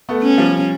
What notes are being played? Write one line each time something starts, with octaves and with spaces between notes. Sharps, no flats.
A3 B3
C#4
F3 G3